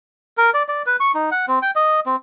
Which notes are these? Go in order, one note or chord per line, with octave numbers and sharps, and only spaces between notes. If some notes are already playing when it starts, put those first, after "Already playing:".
A#4
D5
D5
B4
C#6
D#4
F#5
C4
G5
D#5
C4